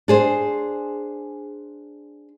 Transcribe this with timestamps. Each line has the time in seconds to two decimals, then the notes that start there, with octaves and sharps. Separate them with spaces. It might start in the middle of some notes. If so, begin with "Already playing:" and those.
0.08 D4 G#4 C5